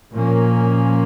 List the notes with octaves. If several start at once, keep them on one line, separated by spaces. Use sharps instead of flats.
A#2 F3 A#3 C#4